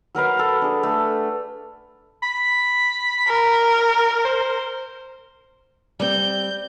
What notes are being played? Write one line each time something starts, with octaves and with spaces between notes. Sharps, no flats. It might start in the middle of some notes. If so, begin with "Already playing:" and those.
F#3 A#4 B4 F5
A4
D4 G#4
A3
B5
A#4
C5
G3 C4 G6